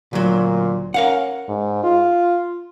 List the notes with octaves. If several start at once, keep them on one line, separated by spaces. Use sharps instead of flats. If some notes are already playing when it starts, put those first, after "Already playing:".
D2 A#2 F#3
C#4 A#4 F5 F#5
G#2
F4